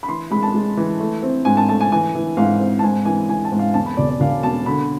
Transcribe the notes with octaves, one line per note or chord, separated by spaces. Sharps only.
B5
E3 C6
G#3 B5
A5
G#3
E3
A3
C4
G#2 G#5
A5
A3 A5
G#5
E3 G#5
E3
G#2 F5
C4
A5
G#2 G#5
E3 G#5
E3 G#5
A5
G#2
F5
E2 A5
B5
E1 D5
D5
E1 F5
B2 A5
D3 B5